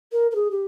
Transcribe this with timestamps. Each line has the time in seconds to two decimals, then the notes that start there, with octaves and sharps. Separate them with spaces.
0.12 A#4
0.31 A#4
0.35 G#4
0.50 G4